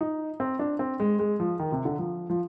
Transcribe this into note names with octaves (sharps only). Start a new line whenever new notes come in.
D#4
C4
D4
C4
G#3
G#3
F3
D#3
C3
D3
F3
F3